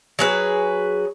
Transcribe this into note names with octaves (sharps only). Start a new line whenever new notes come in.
F#3 G#4 B4